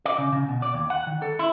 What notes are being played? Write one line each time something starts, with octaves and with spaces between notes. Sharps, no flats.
D5
C#3
C#3
B2
D5
D#2
F#5
D#3
A4
E4